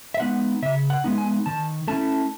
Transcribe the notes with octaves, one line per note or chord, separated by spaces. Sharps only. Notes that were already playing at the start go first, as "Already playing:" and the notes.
E5
G#3 B3 D#4 F#5
C#3 E5
F#5
G#3 B3 D#4
G#5
D#3 A5
A3 C#4 E4 A5